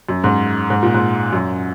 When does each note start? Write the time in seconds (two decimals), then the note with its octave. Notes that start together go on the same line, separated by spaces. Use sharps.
0.09 F#2
0.24 G#2
0.70 G#2
0.83 A#2
0.94 G#2
1.33 F#2